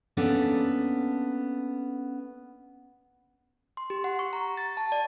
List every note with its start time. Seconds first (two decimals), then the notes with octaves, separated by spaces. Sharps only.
0.17 A#3 B3 C#4 D4 A4
3.77 C6
3.90 G4
4.04 F#5
4.19 C#6
4.33 A#5
4.57 A6
4.77 A5
4.92 D5